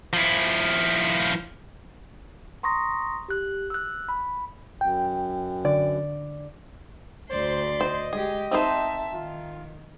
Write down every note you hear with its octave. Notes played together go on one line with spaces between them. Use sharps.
F3 E4
A#5 C6 C#6 D#6 A#6
G4 F#6
E6 F#6
B5
F#2 G5
D3 D5
D2 C5 D5 C6
C5 D#5
G#3 G4 G#4
C4 D#4 C5 E5 A5
D#3 F4